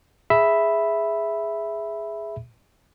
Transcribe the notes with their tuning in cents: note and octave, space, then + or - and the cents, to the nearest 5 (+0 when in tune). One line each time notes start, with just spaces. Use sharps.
G#4 +0 E5 +0 B5 +0